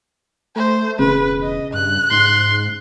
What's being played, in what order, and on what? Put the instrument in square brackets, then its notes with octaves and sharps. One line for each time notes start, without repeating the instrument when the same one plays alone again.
[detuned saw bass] A3 [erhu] C5
[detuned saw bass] E1 [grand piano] C#3 [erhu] B4
[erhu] D#5
[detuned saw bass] G2 [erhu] F#6
[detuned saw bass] G#2 [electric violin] C6